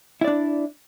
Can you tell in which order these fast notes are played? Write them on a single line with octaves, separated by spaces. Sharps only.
E4 D5 D4